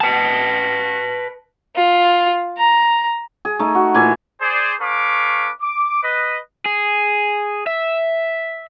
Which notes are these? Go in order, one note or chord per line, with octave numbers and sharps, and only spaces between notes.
B4 A5
F4
A#5
G#4
A3 D#4
F#4
A#2 E3 A3 G#5
G#4 C5 D5
C#4 A4 B4 F5 C#6 D6
D6
B4 D#5
G#4
E5